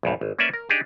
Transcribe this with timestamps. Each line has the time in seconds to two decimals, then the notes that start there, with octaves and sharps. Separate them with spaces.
0.03 A#1 E2 G2
0.21 G#1
0.39 A#3 C#4 B4 D5 E5
0.54 A#4
0.69 D4 D#4 G4 G#4